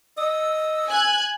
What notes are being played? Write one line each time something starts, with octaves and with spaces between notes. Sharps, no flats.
D#5 E6
G#5 F#6 G#6